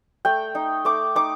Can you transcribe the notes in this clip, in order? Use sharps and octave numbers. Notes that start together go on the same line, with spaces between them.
A3 G5
D#4
A3 D6
D#4 D6